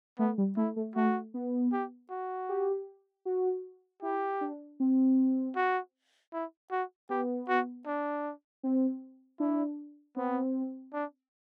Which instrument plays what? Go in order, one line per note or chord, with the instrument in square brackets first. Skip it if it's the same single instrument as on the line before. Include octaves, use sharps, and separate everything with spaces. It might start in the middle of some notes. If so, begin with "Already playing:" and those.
[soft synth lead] A3 [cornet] B3
[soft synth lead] G3
[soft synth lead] A3 [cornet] E4
[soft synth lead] A3
[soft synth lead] A3 [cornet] F#4
[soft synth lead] B3
[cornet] G4
F#4
[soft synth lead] G4
F#4
[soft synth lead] E4 [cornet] G4
[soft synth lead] D4
C4
[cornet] F#4
E4
F#4
[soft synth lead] B3 [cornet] G4
[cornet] F#4
D4
[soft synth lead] C4
[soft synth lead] D4 [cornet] E4
[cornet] B3 [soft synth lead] C4
[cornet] D4